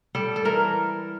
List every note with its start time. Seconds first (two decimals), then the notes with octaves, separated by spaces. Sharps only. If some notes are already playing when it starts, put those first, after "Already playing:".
0.15 G3 A4
0.36 A4
0.45 E3 A#4